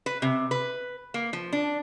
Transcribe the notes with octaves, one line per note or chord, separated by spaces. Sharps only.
B4
C3
B4
A#3
F3
D4